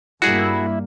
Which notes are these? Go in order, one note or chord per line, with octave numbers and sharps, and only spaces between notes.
G2 G3 A#3 E4 F#4 G#4